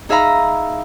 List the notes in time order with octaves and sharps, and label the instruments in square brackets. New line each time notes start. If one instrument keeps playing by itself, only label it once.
[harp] D#4 G#4 E5 F5 A#5 B5